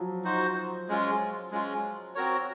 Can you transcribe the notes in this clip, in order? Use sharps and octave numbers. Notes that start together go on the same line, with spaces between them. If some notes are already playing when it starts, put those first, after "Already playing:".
Already playing: F3 F#3
D#4 F#4 C5
G#3 C#4 F4
G#3 C#4 F4
C4 F#4 A#4 C#5